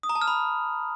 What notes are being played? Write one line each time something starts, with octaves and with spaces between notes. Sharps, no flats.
D#6
A#5
A5
F6
B5